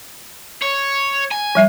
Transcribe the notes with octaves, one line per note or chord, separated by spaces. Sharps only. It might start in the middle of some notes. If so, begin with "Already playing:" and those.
C#5
G#5
F3 G3 E5